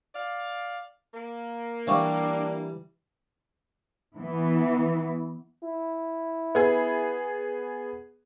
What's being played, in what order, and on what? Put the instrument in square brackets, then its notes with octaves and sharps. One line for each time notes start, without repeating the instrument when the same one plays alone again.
[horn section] D5 F5
A#3
[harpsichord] E3 G3 [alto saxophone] D4 [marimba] F5 C#6 D6
[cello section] E3 B3
[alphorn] E4
[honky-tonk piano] B3 G#4